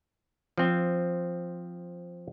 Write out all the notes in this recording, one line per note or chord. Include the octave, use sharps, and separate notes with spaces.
F3 C4